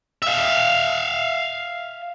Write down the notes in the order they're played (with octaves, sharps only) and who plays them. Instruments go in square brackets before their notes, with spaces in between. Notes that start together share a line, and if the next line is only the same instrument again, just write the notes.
[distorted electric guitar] E5 F5